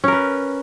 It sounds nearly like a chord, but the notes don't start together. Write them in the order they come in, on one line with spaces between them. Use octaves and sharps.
C#4 A#4 B4